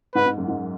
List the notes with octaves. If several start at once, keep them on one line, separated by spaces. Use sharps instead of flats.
G#2 B4
G#2
F#2
G#2